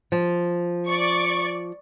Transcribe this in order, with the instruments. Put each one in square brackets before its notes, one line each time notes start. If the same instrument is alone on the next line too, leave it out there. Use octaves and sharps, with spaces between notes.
[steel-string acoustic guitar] F3
[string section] D5 C#6